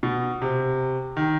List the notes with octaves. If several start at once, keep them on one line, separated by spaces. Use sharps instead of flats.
B2
C3
D#3